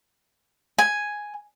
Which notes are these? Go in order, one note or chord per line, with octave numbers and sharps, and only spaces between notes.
G#5